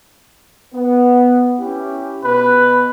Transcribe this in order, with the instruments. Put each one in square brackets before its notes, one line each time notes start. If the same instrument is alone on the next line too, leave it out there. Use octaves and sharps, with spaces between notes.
[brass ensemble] B3
C#4 E4 G4
[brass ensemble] B2 [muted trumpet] B4